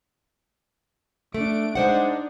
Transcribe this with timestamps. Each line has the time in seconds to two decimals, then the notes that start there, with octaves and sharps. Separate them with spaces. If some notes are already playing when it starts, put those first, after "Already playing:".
1.34 A3 D4 D7
1.75 G#3 D4 D#4 C5 F#5